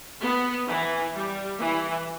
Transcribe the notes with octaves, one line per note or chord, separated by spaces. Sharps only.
B3
E3
G3
E3